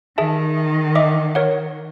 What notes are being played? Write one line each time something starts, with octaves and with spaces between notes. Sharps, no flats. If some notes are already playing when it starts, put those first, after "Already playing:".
D#3 G#4 E5 A5
D#5 E5 D6
A#4 C#5 F#5